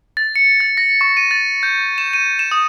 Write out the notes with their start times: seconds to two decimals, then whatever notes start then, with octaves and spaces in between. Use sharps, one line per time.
0.17 A6
0.36 C#7
0.60 A6
0.77 A#6
1.01 C#6
1.17 D#7
1.31 A6
1.63 G6
1.98 E7
2.13 D#7
2.39 E7
2.51 D#6